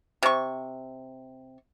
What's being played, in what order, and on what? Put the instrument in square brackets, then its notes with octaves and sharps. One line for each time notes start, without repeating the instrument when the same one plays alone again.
[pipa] C3 C#6